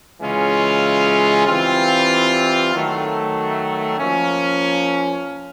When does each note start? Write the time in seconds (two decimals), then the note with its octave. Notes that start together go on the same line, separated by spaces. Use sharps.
0.20 C#3 E3 G#3 C#4 F4
1.46 E3 G3 C4 F4
2.73 D#3 F#3 A3
3.99 F3 A#3 C#4